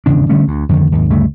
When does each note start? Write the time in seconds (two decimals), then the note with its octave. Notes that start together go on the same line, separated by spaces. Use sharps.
0.06 G#1 E2 C#3 D4
0.29 D3 G3 A3 C#4
0.48 D2
0.69 F2 D3 D#3
0.92 D#2 G#2
1.10 D2 G2 C#3 A3